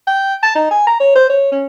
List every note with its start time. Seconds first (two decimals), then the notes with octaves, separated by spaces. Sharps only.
0.07 G5
0.43 A5
0.55 D#4
0.71 G#5
0.87 A#5
1.00 C#5
1.15 C5
1.30 C#5
1.52 C#4